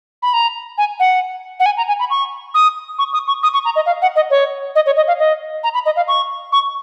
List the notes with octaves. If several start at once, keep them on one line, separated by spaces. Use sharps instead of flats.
B5
A#5
G#5
F#5
F#5
G#5
A#5
G#5
B5
C#6
D#6
C#6
D#6
C#6
D#6
C#6
A#5
D#5
F5
F#5
D#5
C#5
D#5
C#5
D#5
F5
D#5
A#5
B5
D#5
F5
C#6
C#6